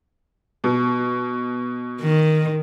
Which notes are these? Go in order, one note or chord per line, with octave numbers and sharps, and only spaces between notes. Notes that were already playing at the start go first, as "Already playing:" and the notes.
B2
D#3